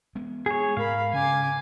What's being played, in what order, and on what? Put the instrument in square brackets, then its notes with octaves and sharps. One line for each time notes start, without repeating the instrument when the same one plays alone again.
[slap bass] G#3 B3
[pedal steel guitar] G#4 C#5
[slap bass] G#2 [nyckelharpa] A#4 B5 [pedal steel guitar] F5
[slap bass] C#3 [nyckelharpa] G#5 D6